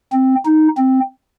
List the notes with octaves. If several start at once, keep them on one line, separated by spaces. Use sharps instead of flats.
C4
D#4
C4